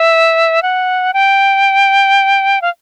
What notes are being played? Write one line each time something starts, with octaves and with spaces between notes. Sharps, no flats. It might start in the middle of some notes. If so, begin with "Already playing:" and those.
Already playing: E5
F#5
G5
F5